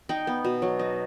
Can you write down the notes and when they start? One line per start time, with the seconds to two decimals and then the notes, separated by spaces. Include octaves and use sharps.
0.09 D#4 G5
0.27 B3
0.45 B2
0.62 F#3
0.79 D#4